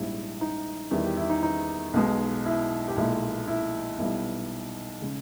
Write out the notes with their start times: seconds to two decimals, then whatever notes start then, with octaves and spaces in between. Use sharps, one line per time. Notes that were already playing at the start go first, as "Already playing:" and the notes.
Already playing: A#1 G#2 G3 E4
0.41 D#4
0.91 E2 D#3 G3 E4
1.04 G4
1.17 E4
1.30 D#4
1.43 D#4
1.94 B1 B2 G#3
2.46 E4
2.88 G4
2.97 B1 A#2 G#3 E4
3.48 E4
3.98 B1 B2 G3 E4
5.02 C#3 G#3